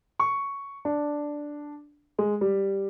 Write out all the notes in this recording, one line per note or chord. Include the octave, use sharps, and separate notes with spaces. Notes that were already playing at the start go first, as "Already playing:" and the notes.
C#6
D4
G#3
G3